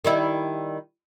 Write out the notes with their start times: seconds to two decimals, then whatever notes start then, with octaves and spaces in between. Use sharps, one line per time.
0.05 D#3 G3 E4